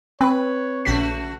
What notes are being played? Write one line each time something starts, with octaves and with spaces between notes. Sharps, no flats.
C4 B4 C#5 G5 B5
A#1 C#3 A3 F#4 B6